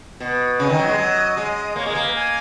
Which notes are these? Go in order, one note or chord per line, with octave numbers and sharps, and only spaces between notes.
B2
C#3 D#5
D#3
F#3
G#3
F#3
G#3
A#3 C#5
G#3 A#4
A#3
B4
G#5